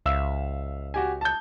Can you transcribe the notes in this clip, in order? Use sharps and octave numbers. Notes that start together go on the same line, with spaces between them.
C#2 E5 F5 E6
F#4 G4 G#5
A5 G6